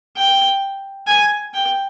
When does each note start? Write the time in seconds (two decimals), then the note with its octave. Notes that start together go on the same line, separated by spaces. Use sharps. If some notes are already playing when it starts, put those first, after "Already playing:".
0.17 G5
1.07 G#5
1.54 G5